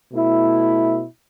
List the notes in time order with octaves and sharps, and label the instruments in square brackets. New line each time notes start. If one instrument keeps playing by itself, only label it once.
[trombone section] B2 A3 E4